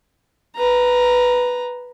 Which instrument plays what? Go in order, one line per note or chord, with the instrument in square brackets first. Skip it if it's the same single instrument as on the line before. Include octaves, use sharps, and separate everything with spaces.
[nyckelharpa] B4 A#5